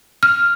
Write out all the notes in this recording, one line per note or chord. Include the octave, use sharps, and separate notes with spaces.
F6